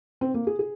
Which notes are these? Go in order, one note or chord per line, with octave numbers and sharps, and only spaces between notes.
C4
A#3
G#4
G#4